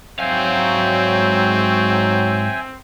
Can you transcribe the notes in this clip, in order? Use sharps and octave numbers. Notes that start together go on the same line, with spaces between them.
G#2 F#3 C4 E5 F5 G5 G#5